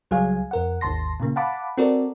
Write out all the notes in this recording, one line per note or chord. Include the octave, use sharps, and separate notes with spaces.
C#2 F#3 G3 G#4 F5 G#5
F2 A#4 F#5
G#1 D#2 A5 C6 A#6
A#2 C#3 A#3
F5 F#5 A5 B5 D6
C4 F#4 A4 A#4 D5